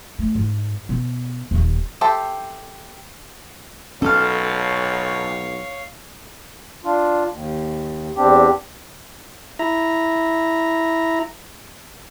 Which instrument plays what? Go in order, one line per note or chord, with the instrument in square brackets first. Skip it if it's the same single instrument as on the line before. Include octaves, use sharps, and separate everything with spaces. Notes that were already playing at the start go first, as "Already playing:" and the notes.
[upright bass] A3
G#2
B2
D#1 D#2
[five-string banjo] G4 A4 C5 E5 G5
[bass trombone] B1 [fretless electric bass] C#4 [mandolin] A4 F6 [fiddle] C#5 F5
[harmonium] D4 F4
D#2
E2 C4 D4 G4
[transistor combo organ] E4 A#5